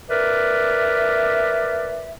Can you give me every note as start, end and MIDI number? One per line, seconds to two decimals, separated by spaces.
0.10 2.12 70
0.10 2.12 71
0.10 2.12 74
0.10 2.12 76